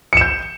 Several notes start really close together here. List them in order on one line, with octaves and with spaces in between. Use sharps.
C#7 E7 G6